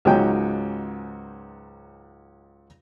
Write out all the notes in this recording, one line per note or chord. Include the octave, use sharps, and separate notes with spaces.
C#2 G#2 F#3 C#4 D#4 G5